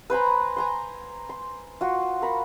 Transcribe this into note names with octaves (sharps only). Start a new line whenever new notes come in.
B4 C5 G#5 A#5
G#5 A#5 C6
C6
F4 F#4
A#4 B5